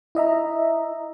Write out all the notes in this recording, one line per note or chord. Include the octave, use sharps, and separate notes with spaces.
E4 D#5 E5 A#5